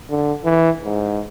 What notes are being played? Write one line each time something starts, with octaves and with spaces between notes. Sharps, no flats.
D3
E3
G#2